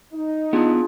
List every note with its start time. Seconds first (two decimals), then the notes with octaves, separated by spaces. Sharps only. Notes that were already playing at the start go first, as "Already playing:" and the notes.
0.12 D#4
0.53 B3 D4 F4 G#4 G#5